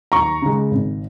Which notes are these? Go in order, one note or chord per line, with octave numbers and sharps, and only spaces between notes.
D#2 A#5 C#6
C#3 G#3
G#1